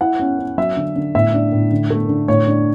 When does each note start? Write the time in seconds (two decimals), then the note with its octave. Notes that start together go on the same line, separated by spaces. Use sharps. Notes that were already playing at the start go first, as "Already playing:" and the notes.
0.01 E4 F#5
0.19 C#4
0.39 C#4
0.58 F#3 E5
0.77 D3
0.96 D3
1.15 A2 E5
1.34 D4
1.52 A2
1.71 D3
1.90 A3
2.09 D3
2.28 A2 C#5
2.47 D4